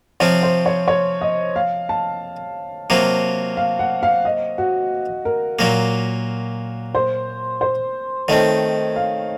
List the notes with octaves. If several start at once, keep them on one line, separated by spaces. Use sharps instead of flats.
C3 F3 C4 F4 C#5
C5
C#5
C#5
D#5
F5
A5
C3 F#3 A#3 F4
F5
F#5
F5
D#5
F#4
A#4
A#2 F#3 A#3 A#4
C5
C5
D#3 A3 C4 C#5
F5